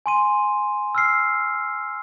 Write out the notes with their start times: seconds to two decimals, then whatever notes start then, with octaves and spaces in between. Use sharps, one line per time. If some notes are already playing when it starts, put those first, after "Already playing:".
0.06 G#5 C6 D#7
0.95 E6 F6 C7